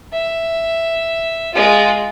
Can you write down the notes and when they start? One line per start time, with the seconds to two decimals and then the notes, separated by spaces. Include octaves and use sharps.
0.13 E5
1.54 G#3 F4